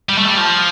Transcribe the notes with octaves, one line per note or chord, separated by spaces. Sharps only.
G3
A3
G3
F3